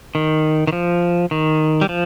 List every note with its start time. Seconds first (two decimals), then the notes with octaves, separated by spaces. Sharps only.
0.15 D#3
0.67 D#3
0.73 F3
1.31 D#3
1.81 G3
1.89 F3